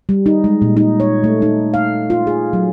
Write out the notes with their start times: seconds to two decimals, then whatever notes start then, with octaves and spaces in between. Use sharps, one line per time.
0.09 G3
0.26 D#4
0.44 G#3
0.62 A#2
0.77 D#4
1.00 C#5
1.24 A3
1.42 D#4
1.74 F5
2.10 F4
2.27 G#4
2.53 F#3